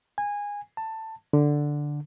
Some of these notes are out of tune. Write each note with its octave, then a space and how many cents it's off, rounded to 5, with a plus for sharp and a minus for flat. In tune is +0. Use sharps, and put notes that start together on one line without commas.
G#5 -20
A5 +15
D3 +0